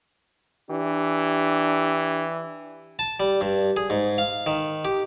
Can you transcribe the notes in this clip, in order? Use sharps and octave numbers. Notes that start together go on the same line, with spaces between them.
E3 D4 G4
A5
G3
G2
G#4
G#2
F5
D#3
G4